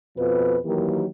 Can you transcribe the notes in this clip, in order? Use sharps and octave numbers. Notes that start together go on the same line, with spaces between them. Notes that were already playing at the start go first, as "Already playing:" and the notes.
F2 B2 F3 B4
D#3 E3 F#3 A#3 G4